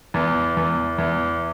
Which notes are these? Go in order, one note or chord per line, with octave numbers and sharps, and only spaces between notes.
E2
E2
E2